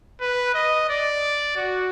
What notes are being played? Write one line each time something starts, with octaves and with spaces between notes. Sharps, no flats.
B4
D#5
D5
F#4